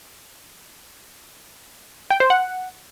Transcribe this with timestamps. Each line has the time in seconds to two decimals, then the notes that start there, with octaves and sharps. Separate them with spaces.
2.11 G5
2.20 C5
2.30 F#5